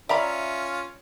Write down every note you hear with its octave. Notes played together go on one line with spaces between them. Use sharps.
C#4 F4 D5 E5 A#5 B5